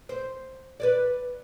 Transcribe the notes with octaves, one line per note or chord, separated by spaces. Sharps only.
C5
B4 C#5 D5